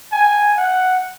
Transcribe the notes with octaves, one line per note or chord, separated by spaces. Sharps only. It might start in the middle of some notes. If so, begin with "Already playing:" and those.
G#5
F#5